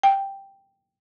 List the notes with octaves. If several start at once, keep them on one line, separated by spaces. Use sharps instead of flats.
G5